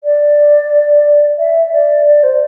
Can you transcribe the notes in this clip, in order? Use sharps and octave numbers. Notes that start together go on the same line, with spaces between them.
D5
E5
D5
D5
C5